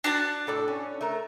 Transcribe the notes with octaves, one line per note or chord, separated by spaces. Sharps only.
D4 F#4 A5
A2 A4 D5
C#4
A3 A#4